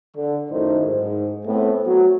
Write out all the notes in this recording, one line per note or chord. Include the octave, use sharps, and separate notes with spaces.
D3
F#2 A2 D#3 D#4 C5
G#2
A2 A3 B3 C4
F#3